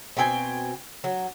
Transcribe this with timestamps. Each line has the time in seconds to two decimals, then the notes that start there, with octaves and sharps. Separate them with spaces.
0.17 B2 C4 G5 G#5
1.04 F#3